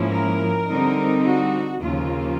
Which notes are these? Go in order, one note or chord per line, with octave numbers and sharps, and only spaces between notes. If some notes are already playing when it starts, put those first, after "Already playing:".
Already playing: G#2 F3 A#3 C#4 E4
A#4
D3 G3 C4 D#4
F#4
D#2 C#3 F3 A#3 F4